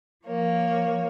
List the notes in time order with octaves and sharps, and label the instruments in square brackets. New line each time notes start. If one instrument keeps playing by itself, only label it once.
[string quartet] F3 A#3 C#5